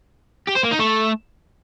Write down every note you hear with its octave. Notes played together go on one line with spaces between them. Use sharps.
G4
C5
A#3
D#4
A3